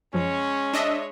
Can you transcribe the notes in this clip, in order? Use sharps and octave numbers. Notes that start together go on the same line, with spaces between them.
F#2 F3 G#3 C#4 C#5
D4 D#5 E5